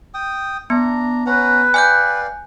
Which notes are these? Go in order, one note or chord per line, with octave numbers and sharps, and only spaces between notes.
G5 D#6
B3 D4 A#5
C#4 B4 F#5 A#5
D5 F5 G5 G#5 F#6 G6